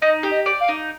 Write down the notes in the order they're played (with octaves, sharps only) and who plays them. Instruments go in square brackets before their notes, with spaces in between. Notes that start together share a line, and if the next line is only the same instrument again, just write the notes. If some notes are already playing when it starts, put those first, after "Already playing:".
[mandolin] D#4 [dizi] D#5
[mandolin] G4
[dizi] D#5
[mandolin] D5
[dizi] F5
[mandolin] D#4